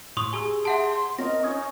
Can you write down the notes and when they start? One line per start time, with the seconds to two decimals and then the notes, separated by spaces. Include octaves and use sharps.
0.17 A2 C6 C#6 D#6
0.33 G4 G#4 G#5 A#5 E6 G7
0.65 E5 F#5 A5 C6
1.19 C4 F4 A#4 C#5 D#5 A#6
1.43 C#4 D#4 C#6 D#6 G#6